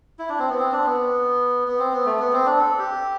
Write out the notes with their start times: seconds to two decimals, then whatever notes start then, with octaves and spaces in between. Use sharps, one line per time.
0.19 E4
0.29 D4
0.39 C4
0.49 B3
0.59 C4
0.72 D4
0.86 B3
1.68 B3
1.79 C4
1.92 B3
2.06 A3
2.19 B3
2.33 C4
2.46 D4
2.59 A4
2.79 G4